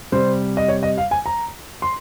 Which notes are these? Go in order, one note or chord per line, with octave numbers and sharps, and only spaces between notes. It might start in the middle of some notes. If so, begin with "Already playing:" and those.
C3 G3 C5
D#5
C#5
D#5
F5
G#5
A#5
C6